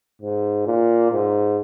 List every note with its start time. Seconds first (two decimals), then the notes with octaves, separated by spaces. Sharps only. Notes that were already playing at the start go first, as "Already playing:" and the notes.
0.22 G#2
0.67 A#2
1.12 G#2